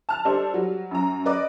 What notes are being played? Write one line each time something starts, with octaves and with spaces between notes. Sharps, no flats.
A5 F6
G3 D4 A4 C5
F#3 G3
F#2 A#5
B4 D5 D#5 D6